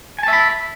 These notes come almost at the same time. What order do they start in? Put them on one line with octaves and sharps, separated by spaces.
G#5 A5 E5 B5